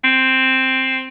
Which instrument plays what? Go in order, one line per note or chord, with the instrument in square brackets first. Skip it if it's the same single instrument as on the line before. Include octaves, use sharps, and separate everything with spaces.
[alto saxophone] C4